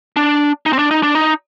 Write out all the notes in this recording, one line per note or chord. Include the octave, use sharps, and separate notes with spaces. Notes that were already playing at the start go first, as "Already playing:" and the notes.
D4
D#4
C4
D4
D#4
D4
D#4